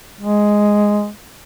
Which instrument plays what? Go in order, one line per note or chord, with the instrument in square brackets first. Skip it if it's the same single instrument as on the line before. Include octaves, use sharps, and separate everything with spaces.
[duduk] G#3